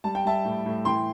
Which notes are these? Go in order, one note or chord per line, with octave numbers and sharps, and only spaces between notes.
G3 A5
G5
G3 E5 A5
A2
A2
E3 G5 C6